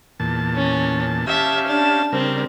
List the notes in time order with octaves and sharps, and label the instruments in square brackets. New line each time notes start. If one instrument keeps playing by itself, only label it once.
[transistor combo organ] E2 A#2 A5
[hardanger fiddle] C#4
[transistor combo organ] C#4 G4 F5 [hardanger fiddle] E5 A5
[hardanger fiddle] D4 A5
[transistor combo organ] C#3 G3 A#4 [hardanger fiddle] C4 D4